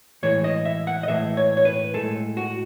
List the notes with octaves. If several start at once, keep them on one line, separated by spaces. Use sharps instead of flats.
A2 E3 G#3 C#5
D#5
E5
F#5
D#5
A2 E3 G#3 E5
C#5
C#5
B4
A2 G#3 A4
F#4